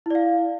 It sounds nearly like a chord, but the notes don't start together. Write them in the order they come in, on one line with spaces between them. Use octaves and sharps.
E4 D5 F5